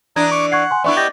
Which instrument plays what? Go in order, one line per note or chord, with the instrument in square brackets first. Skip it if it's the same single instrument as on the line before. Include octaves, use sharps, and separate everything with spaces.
[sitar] E3 D4 [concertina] A#5 D#6 [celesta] G#6
[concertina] C#6 D6
[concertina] F#5 [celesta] C#6 G#6 C7
[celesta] G#5 C6
[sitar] B3 D4 E4 [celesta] D5 E5 C#6
[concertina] G4 D#5 G5 [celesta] D6 A6 A#6